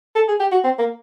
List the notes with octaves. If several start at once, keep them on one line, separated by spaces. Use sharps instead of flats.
A4
G#4
G4
F#4
C4
A#3